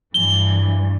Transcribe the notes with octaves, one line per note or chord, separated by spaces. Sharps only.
G2 E3 G7